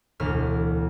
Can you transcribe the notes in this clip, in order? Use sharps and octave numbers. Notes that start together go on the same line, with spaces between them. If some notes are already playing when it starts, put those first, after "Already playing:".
E1 D2 F6